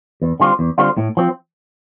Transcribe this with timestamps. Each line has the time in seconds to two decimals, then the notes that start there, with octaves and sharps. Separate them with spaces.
0.22 E2
0.40 D3 G3 C4 F4
0.59 E2
0.78 D3 G3 C4 F4
0.97 A2
1.17 F3 C4